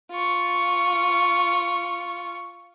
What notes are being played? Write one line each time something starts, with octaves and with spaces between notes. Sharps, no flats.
F4 C#6